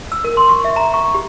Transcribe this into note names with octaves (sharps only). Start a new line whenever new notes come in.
E6
A#4
C6
C#6
E5
A#5
C#6
G4